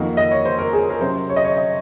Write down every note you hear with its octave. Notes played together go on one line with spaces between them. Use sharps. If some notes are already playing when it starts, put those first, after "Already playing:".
Already playing: F2 D#3 A#3 D#4 F#4
D#5
C#5
C5
A#4
G#4
A#4
C3 F#3 C#4 C5
C#5
D#5
C#5
D#5